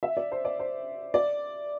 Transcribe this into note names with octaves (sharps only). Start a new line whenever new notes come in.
E5
D5
C5
D5
C5
D5